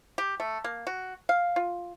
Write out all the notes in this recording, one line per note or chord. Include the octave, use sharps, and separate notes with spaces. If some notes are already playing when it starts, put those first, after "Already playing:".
G4
A3
A#3
F#4
F5
F4